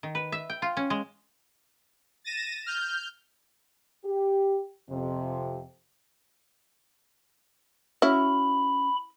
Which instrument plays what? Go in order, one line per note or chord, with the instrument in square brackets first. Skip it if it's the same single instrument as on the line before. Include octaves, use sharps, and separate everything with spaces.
[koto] D#3
B4
E5
G5
F4
C#4
G#3
[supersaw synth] A6 A#6 D#7 E7
F6 G6
[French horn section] G4
F2 C3
[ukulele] C#4 F#4 E5 [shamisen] E4 [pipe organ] B5